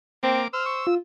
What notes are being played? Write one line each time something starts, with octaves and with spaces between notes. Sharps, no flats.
A#3 C4 D6
C5 E6 F6
C#6
F4